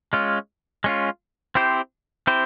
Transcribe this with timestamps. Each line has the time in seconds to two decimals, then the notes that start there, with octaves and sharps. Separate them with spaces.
0.13 G#3 C#4 F4
0.84 G#3 C#4 F4
1.55 C4 E4 G4 C5
2.27 C4 E4 G4 C5